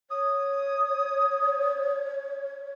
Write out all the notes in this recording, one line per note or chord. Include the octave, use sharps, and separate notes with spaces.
C#5 D#6